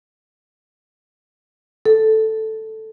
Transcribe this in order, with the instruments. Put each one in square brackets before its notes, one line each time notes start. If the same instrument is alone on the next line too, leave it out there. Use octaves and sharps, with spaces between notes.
[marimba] A4